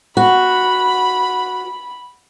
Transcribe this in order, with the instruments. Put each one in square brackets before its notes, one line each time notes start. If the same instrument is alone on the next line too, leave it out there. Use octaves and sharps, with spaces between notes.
[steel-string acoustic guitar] F#4 [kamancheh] B5